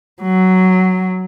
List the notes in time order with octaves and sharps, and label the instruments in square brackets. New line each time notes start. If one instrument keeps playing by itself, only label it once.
[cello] F#3